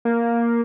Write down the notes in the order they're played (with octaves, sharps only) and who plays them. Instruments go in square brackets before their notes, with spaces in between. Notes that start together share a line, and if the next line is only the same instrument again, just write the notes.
[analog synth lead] A#3